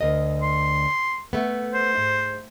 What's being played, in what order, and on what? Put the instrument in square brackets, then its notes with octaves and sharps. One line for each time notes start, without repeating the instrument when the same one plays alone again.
[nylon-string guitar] D2 A#4 D#5
[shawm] C6
[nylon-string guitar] A3 B3
[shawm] C5
[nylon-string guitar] G#2